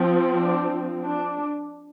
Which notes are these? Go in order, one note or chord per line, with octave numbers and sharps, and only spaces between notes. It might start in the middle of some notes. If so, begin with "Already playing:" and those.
Already playing: F3 C4
D4
D4